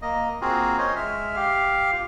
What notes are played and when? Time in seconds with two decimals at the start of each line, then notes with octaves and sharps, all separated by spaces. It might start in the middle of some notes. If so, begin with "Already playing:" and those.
0.02 A#3 D#5
0.41 A#3 C4 F4 F#4 G#4
0.78 C#4 C5 C#5 D#5
0.96 G#3 E5 F6
1.36 G4 F5
1.93 F4